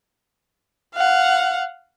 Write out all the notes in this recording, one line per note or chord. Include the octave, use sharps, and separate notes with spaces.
F5 F#5